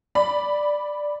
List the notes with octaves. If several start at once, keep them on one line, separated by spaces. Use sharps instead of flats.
D5 B5